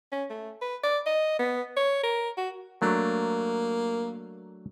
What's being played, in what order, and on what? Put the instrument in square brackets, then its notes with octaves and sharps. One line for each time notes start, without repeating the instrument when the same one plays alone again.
[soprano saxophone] C#4
A3
B4
D5
D#5
B3
C#5
A#4
F#4
[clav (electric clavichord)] F#3 A3 D4 [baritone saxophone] A#3